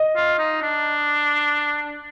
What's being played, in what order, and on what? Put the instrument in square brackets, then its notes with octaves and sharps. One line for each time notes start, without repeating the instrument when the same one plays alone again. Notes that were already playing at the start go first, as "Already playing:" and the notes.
Already playing: [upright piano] D#5
[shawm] F4
D#4
D4